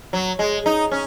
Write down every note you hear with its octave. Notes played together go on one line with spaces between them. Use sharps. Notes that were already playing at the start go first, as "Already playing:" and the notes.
F#3
G#3
D#4
C#4